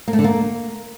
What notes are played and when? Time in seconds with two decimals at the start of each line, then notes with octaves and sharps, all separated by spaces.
0.08 A#3
0.13 A3
0.19 D3
0.24 A#3